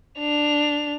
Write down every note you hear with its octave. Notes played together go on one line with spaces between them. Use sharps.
D4 F7